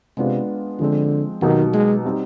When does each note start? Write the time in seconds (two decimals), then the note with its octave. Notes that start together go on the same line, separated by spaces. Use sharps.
0.17 C3 G#3 B3 D4 F4
0.79 D3 F3 G#3 C4
1.42 B2 D#3 F#3 A#3 D#4 G4
1.74 G#3
2.05 G3 C4 D#4 G4